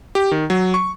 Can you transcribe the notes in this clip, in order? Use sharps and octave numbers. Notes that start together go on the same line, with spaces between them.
G4
D#3
F#3
C#6